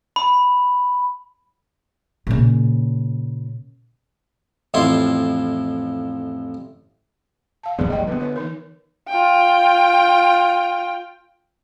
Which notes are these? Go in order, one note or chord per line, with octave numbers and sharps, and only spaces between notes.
B5
A#2 C#3
A1 F2 E4 F4 C6
F5 A5
F2 D3 B3 G#4 D5
F1 G3 D#5 G5
D3 B3 B4
B4 C#5
E3 D#4 A#4
F4 G5